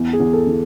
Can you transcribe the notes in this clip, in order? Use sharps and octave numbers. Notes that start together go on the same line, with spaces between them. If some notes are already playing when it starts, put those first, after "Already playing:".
Already playing: E2
G#4
E2
A4
E3